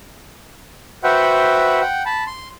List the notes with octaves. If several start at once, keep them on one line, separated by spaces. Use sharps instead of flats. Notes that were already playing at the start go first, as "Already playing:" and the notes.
F#4 B4 C5 E5 F#5 G5
F#5 G5
A5 B5
C6